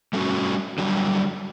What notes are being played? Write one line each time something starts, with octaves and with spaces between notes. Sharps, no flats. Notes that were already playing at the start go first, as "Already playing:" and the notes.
G3 A3 C#4 F#4
D3 F#3 G3